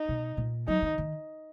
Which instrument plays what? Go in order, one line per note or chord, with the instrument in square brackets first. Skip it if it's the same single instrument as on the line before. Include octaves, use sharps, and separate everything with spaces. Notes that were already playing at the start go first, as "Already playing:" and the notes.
Already playing: [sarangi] D#4
[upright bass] B2
A#2
[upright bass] F#3 [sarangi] D#4
[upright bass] D#3
D#3